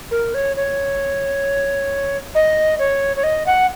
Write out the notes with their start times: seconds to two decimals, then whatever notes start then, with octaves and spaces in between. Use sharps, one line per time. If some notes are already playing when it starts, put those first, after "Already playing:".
0.11 A#4
0.34 C#5
0.56 C#5
2.35 D#5
2.79 C#5
3.16 C#5
3.23 D#5
3.46 F#5